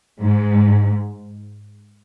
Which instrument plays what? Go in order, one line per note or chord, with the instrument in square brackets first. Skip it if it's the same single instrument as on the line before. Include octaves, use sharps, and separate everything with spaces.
[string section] G#2